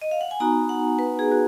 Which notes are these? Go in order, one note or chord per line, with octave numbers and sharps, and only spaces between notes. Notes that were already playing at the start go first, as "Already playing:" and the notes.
D#5
F5
F#5
G#5
B3 D#4 F#4 A#5
F#5
B4
G#4
F#4